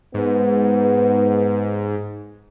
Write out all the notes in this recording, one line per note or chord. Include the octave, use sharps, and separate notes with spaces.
G#2 B3